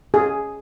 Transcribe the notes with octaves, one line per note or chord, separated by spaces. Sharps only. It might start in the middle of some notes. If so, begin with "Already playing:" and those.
G#4